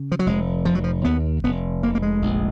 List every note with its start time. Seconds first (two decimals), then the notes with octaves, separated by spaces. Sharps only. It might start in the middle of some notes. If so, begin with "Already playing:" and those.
Already playing: C#3
0.12 F3
0.19 F#3
0.26 F1 G#3
0.65 F1 F3
0.75 F#3
0.84 F3
1.05 D#2 B3
1.44 F1 B3
1.83 F1 A#3
1.95 A#3
2.02 G#3
2.22 A#1